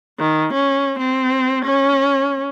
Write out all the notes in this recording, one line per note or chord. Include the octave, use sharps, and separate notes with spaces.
D#3
C#4
C4
C#4